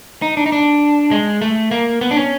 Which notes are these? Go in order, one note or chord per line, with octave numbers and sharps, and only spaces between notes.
D#4
D4
D#4
D4
G#3
A3
A#3
B3
D4
C#4